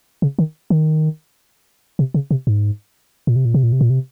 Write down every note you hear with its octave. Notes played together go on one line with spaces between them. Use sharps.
C#3
D#3
D#3
C3
C#3
C3
G#2
A#2
C3
A#2
C3
A#2
C3
A#2
C3